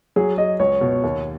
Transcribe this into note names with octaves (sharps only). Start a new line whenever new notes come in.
F#3 G#4
G#4 D#5
C#2 C#5
B2
D#2